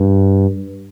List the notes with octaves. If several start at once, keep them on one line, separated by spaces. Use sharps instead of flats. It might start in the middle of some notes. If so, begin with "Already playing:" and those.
Already playing: G2